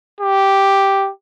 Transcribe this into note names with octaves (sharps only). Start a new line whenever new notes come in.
G4